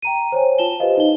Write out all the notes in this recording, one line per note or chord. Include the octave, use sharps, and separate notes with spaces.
G5 A#5 D#7
C5 C#5 G#5
F4 A5 E7 G7
F4 G4 B4 C5 D#5 F5
D#4 D#5 G7